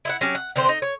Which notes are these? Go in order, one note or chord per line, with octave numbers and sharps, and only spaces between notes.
E4 E5 F#5
F#3 C#4 G4
F#5
D3 E3 C4 C5
D#4
C#5